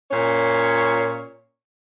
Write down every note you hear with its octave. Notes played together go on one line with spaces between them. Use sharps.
A#2 C#4 C#5